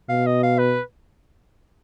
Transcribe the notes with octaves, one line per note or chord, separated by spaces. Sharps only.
B2 F5
D#5
F5
B4